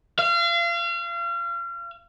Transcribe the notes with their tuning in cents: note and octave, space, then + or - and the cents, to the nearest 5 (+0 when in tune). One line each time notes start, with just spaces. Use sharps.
F5 -35